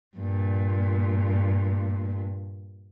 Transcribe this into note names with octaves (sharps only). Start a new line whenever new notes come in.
G2 A#2